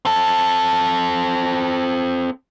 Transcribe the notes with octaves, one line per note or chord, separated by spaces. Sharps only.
C4 A4